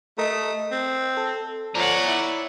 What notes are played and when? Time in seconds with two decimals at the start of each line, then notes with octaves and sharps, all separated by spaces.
0.18 A3 A#4 D#5
0.71 C4
1.17 A4
1.75 F3 C#5 D5 F#5 A#5
2.06 E4